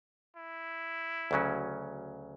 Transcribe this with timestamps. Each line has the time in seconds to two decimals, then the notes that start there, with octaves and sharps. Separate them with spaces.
0.36 E4
1.31 D2 C#3 F#3 C#4